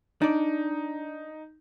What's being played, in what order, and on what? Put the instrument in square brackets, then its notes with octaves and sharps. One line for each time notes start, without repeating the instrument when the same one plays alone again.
[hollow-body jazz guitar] D4 D5 [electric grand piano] D#4